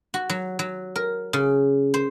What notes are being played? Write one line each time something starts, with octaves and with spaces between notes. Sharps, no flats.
F#4
F#3
F#3
A#4
C#3
C5